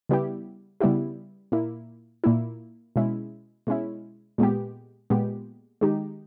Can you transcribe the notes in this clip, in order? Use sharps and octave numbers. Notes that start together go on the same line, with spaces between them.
C#3 G3 B3 E4 G4
C#3 G3 B3 E4 G4
A#2 A#3 E4
A#2 A#3 E4
B2 G#3 C#4 E4
B2 G#3 C#4 E4
A#2 G#3 B3 G4
A#2 G#3 B3 G4
D#3 G#3 D#4 G4